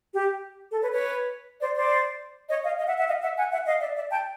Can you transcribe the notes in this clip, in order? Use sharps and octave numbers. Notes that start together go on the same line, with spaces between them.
G4
A4
B4 C#5
B4 C#5
C5 D5
C5 D5
C#5 D#5
D#5 F5
D#5 F5
E5 F#5
E5 F#5
D#5 F5
E5 F#5
F#5 G#5
E5 F#5
D#5 F5
D5 E5
D5 E5
G5 A5